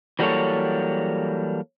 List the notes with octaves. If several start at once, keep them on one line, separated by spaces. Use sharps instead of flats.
E3 F#3 G3 A#3 A4 C#5